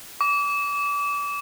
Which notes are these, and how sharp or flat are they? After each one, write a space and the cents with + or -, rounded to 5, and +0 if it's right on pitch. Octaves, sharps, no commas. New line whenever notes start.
D6 -35